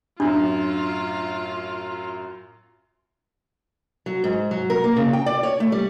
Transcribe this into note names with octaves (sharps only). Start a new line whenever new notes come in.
F#2 A2 D4 F4
F#3
G#2
F#3
A#4
A#3
C#3
G5
D5
C#5
A3
G3